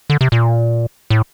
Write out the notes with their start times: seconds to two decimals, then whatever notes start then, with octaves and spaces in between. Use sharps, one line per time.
0.10 D3
0.21 C3
0.32 A#2
1.10 A2